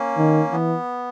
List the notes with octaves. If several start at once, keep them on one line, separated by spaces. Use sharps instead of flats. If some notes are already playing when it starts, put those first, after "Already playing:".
Already playing: A#3 C#4
D#3
E3 B3